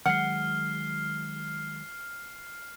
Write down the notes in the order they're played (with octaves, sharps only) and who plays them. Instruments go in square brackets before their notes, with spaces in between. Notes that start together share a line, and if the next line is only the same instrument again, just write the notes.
[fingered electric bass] D#3 F#3 G#3 [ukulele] F#5 [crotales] F6 C7